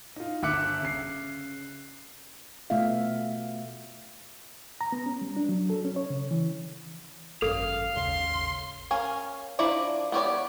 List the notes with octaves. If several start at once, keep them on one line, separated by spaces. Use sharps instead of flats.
D#4 F4
G1 E5 D6 F#6 C#7
C#3 C7
B2 A3 B3 F4 E5 F5
A#5
B3
C#4
G3
D4
F#3
A4
C#4
C#5
C#3
E3
G#1 F#2 C#4 A4 F5
G#1 D#2 C#3 C6
C#4 A#4 F5 G#5
F3 D4 E4 D5 A#5
B3 G4 C#5 D5